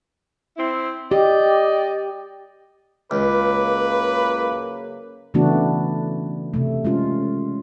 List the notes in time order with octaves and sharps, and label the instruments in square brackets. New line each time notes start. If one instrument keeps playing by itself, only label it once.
[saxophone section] C4 E4
[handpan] G4 [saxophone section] D5 D#5
[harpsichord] C#2 [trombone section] F#2 C#3 A#3 [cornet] B4 [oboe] D6
[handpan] C#3 E3 A3 B3 D4 F#4
C3 A3
G#3 C#4 F4